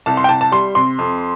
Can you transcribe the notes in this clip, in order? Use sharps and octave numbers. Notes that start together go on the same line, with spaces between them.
C2 A5
C6
G5
C2 A5
A5
G3 C6
C3 C6
F2